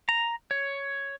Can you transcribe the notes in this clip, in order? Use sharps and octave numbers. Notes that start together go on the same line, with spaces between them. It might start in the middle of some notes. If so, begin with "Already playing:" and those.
A#5
C#5